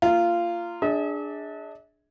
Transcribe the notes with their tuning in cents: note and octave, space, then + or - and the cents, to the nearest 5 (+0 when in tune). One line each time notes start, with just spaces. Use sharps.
A#3 -20 F4 -15
D4 +0 G#4 +0 E5 -45